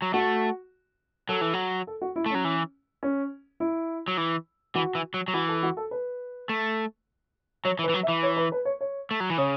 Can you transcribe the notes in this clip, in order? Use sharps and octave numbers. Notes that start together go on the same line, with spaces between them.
F#3
A3 F#4
F#3 A4
E3
F#3
A4
F#4
E4
A3
F#3 C#4
E3
C#4
E4
F#3
E3
E3 F#4
E3
F#3
F#3
E3 F#4
A4
F#4
A4
B4
A3
F#3 C#5
E3
B4
E3
F#3
E5
E3
C#5
B4
B4
C#5
C#5
A3
F#3
E3
C#3 C#5